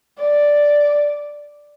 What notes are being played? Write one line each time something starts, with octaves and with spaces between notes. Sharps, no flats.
D5